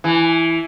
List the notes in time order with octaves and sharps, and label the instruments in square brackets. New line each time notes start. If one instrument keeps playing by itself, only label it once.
[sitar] E3